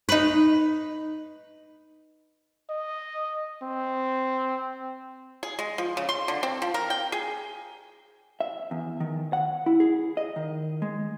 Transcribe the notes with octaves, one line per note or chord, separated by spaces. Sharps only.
D#4 B4
D#5
C4
G#4
G#3
F3
C#3
C6
D3
C4
F3
A#4
G5
G#4
E5
E2
D#3
F#5
E4
G#4
D#5
D#3
G#3